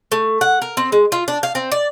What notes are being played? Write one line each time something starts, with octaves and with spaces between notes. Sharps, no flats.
A3
F#5
A#4
C4
G#3
F4
D4
F5
C4
D5